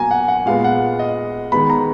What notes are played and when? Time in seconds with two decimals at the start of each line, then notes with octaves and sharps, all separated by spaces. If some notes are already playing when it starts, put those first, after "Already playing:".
Already playing: B2 F#3 A#3 G#5 A#5
0.11 F#5
0.28 F#5
0.46 A#2 G#3 B3 F5
0.64 F#5
0.99 D#5
1.52 D#3 G#3 B3 B5
1.70 A#5